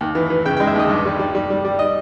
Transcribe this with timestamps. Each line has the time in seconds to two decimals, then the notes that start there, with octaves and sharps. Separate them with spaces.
0.01 D#2
0.15 E3
0.30 E3
0.45 C#3 G5
0.57 G#3 G5
0.67 E5
0.76 D#2 D#5
0.90 G2
1.05 G3
1.19 G3
1.35 G3
1.50 G3
1.65 G3
1.79 D#5